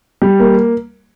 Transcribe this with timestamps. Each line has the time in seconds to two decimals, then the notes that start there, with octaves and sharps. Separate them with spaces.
0.22 G3
0.39 A#3